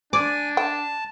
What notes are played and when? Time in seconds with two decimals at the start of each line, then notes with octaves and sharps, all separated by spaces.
0.13 D4 D5 G#5
0.57 G5 A5